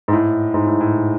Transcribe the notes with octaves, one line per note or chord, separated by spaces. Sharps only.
G#2
A2
G#2
A2
A2